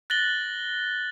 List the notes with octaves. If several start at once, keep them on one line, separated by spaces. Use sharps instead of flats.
F#6 A6 A#6 F#7 G7